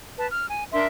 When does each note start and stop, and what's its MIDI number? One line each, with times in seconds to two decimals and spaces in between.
0.18 0.26 71
0.18 0.26 81
0.30 0.46 89
0.49 0.64 80
0.72 0.86 62
0.72 0.86 70
0.72 0.86 76
0.72 0.86 84